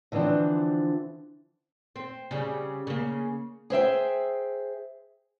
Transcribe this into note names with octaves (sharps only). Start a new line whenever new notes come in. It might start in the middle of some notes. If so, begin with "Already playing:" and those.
D3 E3 F3 C4 D4
C4
C#3 G3
C#3 A#3
G#4 C5 E5 G5